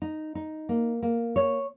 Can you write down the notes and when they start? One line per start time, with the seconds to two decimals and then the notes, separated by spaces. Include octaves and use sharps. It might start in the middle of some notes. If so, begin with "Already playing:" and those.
0.02 D#4
0.35 D#4
0.69 A#3
1.03 A#3
1.36 C#5